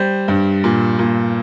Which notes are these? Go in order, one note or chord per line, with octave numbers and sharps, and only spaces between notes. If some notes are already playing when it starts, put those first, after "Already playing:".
Already playing: G3 C5
G2
A#2
A#2